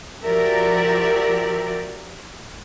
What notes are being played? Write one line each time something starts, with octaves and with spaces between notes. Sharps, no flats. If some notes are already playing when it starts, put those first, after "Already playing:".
F3 F#4 G4 A#4 D5 E5